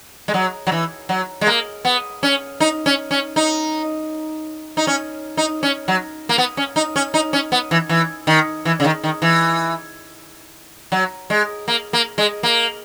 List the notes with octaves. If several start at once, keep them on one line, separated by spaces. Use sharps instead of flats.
G#3
F#3
F#3
E3
F#3
G#3
A#3
B3
C#4
D#4
C#4
C#4
D#4
D#4
C#4
D#4
C#4
F#3
A#3
B3
C#4
D#4
C#4
D#4
C#4
B3
E3
E3
D#3
E3
C#3
D#3
D#3
E3
F#3
G#3
A#3
A#3
G#3
A#3